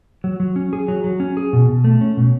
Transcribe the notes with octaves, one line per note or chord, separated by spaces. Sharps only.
F#3
F#3
C#4
G#4
F#3
F#3
C#4
G#4
B2
B2
A3
C#4
B2